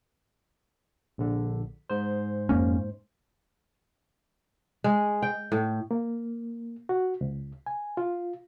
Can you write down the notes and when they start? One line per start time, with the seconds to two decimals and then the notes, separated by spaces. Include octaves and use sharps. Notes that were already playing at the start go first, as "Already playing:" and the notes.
1.18 A#1 D3
1.90 G#2 C5
2.49 F2 A#3 C#4
4.84 G#3
5.22 G5
5.52 A2
5.91 A#3
6.89 F#4
7.21 C#2
7.66 G#5
7.97 F4